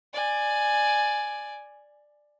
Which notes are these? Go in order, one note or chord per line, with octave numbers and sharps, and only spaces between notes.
D5 G#5